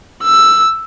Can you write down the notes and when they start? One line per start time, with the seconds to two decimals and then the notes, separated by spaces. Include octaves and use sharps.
0.23 E6